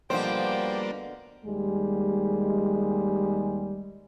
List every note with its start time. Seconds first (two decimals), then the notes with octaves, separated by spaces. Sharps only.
0.10 B2 D3 F3 G3 A#3 D4 C5 G5
1.45 D#2 G3 G#3